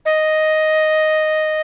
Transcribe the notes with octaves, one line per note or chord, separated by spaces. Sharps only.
D#5